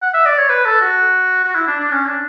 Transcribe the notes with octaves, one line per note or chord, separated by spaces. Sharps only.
F#5
E5
D5
C#5
B4
A4
F#4
F#4
E4
D4
D4
C#4
D4